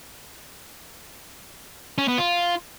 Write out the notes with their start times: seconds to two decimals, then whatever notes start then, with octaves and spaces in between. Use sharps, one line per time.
1.98 C#4
2.08 B3
2.18 F4